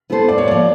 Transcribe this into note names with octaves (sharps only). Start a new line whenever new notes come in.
B3 E4 A4 C5
A2 D5
C#5
F3 A#3 D5